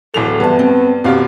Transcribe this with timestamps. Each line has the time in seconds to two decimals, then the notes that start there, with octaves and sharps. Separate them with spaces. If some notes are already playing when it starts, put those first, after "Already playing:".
0.14 D1 E3 A4 F7
0.40 G2 E3 B3 A5
0.59 C4
1.04 G#1 B2 C4 G4 F5